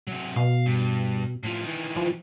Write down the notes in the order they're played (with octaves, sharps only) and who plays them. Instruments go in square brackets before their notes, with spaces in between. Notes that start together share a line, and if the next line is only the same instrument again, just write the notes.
[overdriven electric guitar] C3 F#3
[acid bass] B2 [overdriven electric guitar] F5
[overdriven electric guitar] G2
A2 F3
D#3 E3
[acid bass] F3